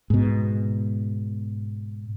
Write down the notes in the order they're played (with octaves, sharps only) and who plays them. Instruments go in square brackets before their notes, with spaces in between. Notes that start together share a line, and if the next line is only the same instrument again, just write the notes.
[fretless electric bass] G#2 B2